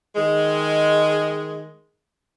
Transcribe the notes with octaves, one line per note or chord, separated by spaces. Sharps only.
D#3 G#3